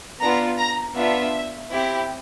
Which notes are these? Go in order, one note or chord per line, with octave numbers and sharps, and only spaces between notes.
B3 D4 F4 A#5
A#5
B3 D4 F4 E5
C4 E4 G4